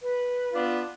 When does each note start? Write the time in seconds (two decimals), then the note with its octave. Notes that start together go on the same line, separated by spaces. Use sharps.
0.02 B4
0.53 B3 D4 F4